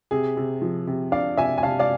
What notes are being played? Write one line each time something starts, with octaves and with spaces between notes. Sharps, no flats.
C3 G#4
C3
F3
C3
D4 D5 F5
C3 E5 G#5
G#5
C3 F5 A5
D5 F5